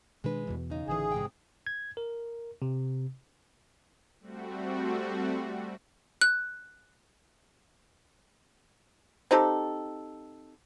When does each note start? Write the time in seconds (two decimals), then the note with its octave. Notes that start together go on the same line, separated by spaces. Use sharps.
0.24 B2 D#3 G#3 D4 B4
0.47 E2 B2 E3
0.70 C#3 D#4
0.88 A1 D3 E3 G#4
1.12 G#2 C3 G5
1.67 G#6
1.97 A#4
2.62 C3
4.20 G3 A3 C4 F#4
6.21 F#6
9.31 C4 D#4 G4 A4